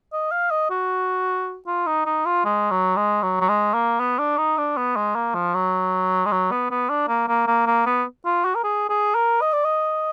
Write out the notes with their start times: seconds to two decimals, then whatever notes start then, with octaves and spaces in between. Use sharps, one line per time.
0.13 D#5
0.31 F5
0.51 D#5
0.70 F#4
1.67 F4
1.86 D#4
2.06 D#4
2.25 F4
2.45 G#3
2.71 F#3
2.96 G#3
3.23 F#3
3.40 F#3
3.48 G#3
3.74 A#3
4.00 B3
4.19 D4
4.37 D#4
4.58 D4
4.77 B3
4.96 G#3
5.15 A#3
5.34 F3
5.54 F#3
6.26 G#3
6.32 F#3
6.51 B3
6.71 B3
6.89 D4
7.08 A#3
7.28 A#3
7.47 A#3
7.66 A#3
7.86 B3
8.25 F4
8.45 F#4
8.55 A#4
8.64 G#4
8.89 G#4
9.15 A#4
9.41 D#5
9.53 D5
9.64 D#5